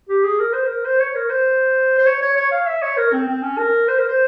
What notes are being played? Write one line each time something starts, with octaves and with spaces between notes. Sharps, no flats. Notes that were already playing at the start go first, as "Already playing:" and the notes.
G4
G#4
A#4
C5
A#4
C5
C#5
A#4
C5
C5
C#5
C#5
C#5
F5
E5
C#5
A#4
C4
C4
C#4
A#4
C5
A#4
C5